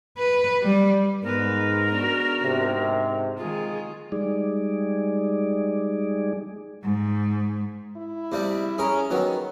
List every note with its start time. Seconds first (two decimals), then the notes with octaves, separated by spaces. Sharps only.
0.18 B4
0.63 G3
1.23 G#2 B3 A#4 B4
1.91 B3 D4 F#4
2.43 G#2 C3
3.38 D#3 G#3 F4 G#4
4.12 G3 G#3 D#4 G#4 D5
6.83 G#2
7.96 E4
8.32 C3 G3 G#3
8.78 C#4 G#4 A#4
9.10 D#3 F#3 B3